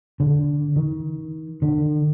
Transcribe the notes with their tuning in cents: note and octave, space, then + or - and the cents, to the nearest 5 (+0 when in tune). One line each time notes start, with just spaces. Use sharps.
D3 -15
D#3 +30
D3 +40